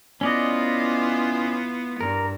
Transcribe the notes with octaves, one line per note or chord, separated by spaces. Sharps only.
B3 C#4 E4 F4 D5 D#5
G2 A#4